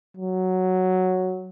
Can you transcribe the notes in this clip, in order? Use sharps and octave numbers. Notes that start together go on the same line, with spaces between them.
F#3